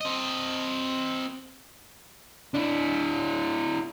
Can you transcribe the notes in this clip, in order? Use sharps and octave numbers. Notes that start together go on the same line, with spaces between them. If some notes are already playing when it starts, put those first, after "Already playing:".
C4 D#5
D4 E4